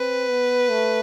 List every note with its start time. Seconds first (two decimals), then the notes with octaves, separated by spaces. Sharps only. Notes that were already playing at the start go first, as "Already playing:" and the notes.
Already playing: C4 B4
0.29 B3
0.70 A3